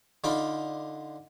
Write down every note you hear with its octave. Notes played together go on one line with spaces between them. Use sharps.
D3 D#4 F4 B5 D6